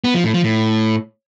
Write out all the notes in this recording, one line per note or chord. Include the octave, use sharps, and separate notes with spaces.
B3
F3
A2
F3
A2